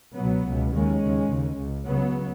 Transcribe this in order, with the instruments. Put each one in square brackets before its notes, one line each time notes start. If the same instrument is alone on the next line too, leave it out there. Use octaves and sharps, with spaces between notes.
[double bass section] C#2 B2 F#3 B3
C#2 B2
D#2 C#3 G#3 C#4
D#2 C#3
D#2 C#3
C#2 C#3
C#2 C#3 F#3 B3